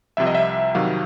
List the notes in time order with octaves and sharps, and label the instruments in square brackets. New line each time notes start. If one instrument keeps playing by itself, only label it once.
[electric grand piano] C2 C3 F3 E5
D#5
E5
F2 C3 D#3 F#3 F5